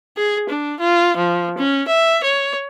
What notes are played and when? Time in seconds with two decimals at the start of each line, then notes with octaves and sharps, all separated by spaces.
0.17 G#4
0.49 D4
0.80 F4
1.17 F3
1.58 C#4
1.88 E5
2.24 C#5